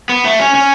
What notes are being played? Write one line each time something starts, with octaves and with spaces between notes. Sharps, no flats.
B3
A3
C#4
C#4